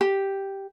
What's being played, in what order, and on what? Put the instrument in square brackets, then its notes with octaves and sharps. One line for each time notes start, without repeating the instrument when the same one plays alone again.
[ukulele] G4